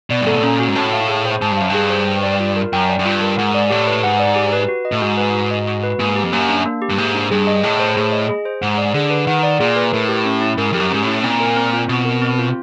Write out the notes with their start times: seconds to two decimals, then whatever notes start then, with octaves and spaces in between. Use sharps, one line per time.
0.10 B2 D5
0.21 G2
0.27 G#2 A4
0.36 A2
0.43 A#2 C#4
0.60 F#4
0.68 G#2
0.75 A2 A5
0.93 F5
1.09 G#4
1.25 C5
1.42 G#2 A5
1.52 G2
1.57 F#2 F5
1.70 G2 G#4
1.90 C5
2.07 G5
2.23 D5
2.40 F4
2.56 A#4
2.73 F#2 G5
2.89 D5
2.99 F#2
3.05 G2 F4
3.21 A#4
3.38 G#2 F#5
3.54 D5
3.70 A2 G4
3.87 B4
4.03 G#2 F#5
4.19 D5
4.36 G4
4.53 B4
4.68 F#4
4.85 D#5
4.92 A2
5.02 G#2 F#4
5.18 B4
5.34 F#4
5.51 D#5
5.67 F#4
5.83 B4
5.99 G#2 A#3
6.16 G4
6.23 F2
6.33 F#2 A#3
6.49 D4
6.66 A#3
6.82 G4
6.90 G2
6.98 G#2 A#3
7.14 D4
7.31 G2 G#4
7.47 D#5
7.63 A2 G#4
7.79 C5
7.96 A2 G#4
8.12 D#5
8.29 G#4
8.45 C5
8.62 G#2 F#5
8.78 D5
8.94 D3 G#4
9.10 B4
9.27 D#3 F#5
9.43 D5
9.60 A#2 G#4
9.76 B4
9.93 A2 A#4
10.09 G4
10.25 C#4
10.41 E4
10.57 G#2 A#4
10.73 F2 G4
10.80 F#2
10.91 G#2 C#4
11.02 A2
11.07 E4
11.23 A#2 C4
11.40 A#4
11.56 C4
11.73 F4
11.89 B2 C4
12.05 A#4
12.22 C4
12.39 F4